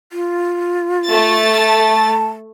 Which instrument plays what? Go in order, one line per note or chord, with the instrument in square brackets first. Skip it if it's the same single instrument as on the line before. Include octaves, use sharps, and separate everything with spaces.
[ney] F4
[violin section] A3 A6
[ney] A5